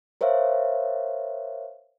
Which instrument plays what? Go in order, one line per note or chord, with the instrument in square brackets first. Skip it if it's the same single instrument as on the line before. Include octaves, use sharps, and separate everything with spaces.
[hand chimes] A#4 C5 C#5 E5 F5